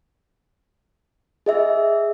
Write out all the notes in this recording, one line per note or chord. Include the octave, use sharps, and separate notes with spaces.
G#4 D#5 E5